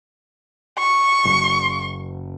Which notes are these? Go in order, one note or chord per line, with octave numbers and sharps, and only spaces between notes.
C#6
F#1